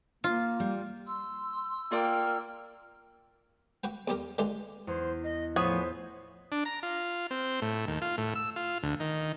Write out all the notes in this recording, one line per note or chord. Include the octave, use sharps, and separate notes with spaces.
A#3 F4
G3
C6 E6
A#3 F4 D5 G5 F6
F#4 B4 G5
E2 G3 G4 A#4
D3 E3 G#3 G4
E2 C5
D#5
A2 F3 B3 G#4 C5 C#5
D4
A#5
F4
C4
A2
D#2
F4
A2
E6
F4
D2
D#3